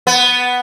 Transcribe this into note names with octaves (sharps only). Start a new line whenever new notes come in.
B3